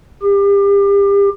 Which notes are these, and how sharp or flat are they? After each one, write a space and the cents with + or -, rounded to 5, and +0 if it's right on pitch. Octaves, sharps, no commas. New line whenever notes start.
G4 +35